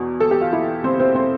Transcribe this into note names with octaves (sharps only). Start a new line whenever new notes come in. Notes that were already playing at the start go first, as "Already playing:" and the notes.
Already playing: E2 B2
A4
G4
F4
E4
C4 C5
C4 C5
C4 C5